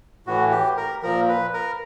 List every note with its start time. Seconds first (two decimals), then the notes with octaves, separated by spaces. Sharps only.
0.27 A2 E3 F#4
0.51 G4
0.77 A#4
1.03 A#2 F3 A#4
1.29 B4
1.54 A#4